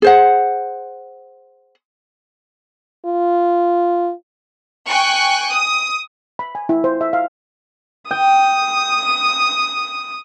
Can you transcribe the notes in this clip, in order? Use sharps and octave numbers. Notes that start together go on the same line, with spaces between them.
G#4 C5 F#5
F4
G5 G#5 C#6 F#6
D#6
B5
G#5
E4
C5
E5
F5
G5 D#6